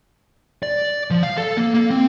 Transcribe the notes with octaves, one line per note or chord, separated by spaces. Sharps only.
D5
F3
F5
A4
A#3
A#3
C4